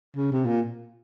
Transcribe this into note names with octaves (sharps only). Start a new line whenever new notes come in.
C#3
C3
A#2